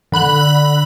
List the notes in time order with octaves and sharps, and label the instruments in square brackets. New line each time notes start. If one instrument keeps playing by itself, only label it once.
[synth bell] D3 B5 F#6 F#7